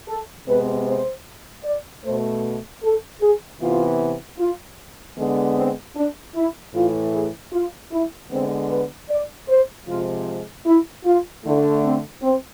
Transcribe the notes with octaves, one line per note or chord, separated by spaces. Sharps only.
A4
C3 G#3 B3 B4
C5
D5
B2 A3 C5
A4
G#4
C3 E3 B3 F4
F4
D3 G#3 B3
C4
D4
E4
A2 E3 A3 F4
G#4
F4
E4
D3 G#3 B3 C4
B4
D5
C5
C3 F3 G#3 F4
E4
F4
D3 A3 E4
C4
C4